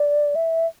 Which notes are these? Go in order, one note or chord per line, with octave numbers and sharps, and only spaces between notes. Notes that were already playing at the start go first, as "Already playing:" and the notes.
Already playing: D5
E5